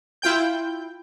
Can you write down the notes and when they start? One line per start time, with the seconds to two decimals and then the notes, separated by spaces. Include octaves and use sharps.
0.22 E4 F4 G5 G6